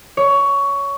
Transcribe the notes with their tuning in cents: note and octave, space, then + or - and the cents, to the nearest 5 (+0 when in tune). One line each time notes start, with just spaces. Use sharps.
C#5 +15